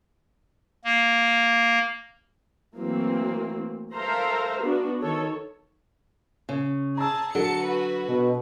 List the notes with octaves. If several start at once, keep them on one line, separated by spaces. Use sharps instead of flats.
A#3
E3 F#3 A3 A#3 C4
A4 A#4 C5 E5 F5 A#5
B3 D4 F#4
D#3 A4 C#5
C#3
G#4 A5 A#5 E6
D3 F#3 A4 A5 C#7 D7
F#4 B4
B2